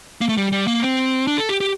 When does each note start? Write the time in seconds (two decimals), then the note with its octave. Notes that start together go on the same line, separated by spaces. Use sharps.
0.21 A#3
0.29 A3
0.37 G3
0.52 G3
0.67 A#3
0.82 C4
1.27 D4
1.38 A4
1.49 G4
1.60 G4